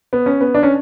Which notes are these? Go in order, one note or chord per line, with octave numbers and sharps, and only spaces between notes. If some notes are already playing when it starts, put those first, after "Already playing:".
B3
C#4
B3
D4
C#4